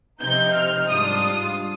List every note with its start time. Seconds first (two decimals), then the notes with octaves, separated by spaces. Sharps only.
0.22 C3 F3 C4 D#4 G6
0.55 F6
0.88 G#2 G3 D4 F4 D#6